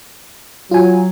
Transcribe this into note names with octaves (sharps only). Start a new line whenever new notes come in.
F#3 F4 G#5